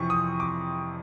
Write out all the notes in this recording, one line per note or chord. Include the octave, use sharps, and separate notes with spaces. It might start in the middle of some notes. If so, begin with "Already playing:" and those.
Already playing: F2 C3 E3 C#6
D#6
D6